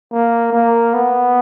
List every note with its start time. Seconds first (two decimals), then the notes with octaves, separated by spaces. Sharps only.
0.12 A#3
0.53 A#3
0.94 B3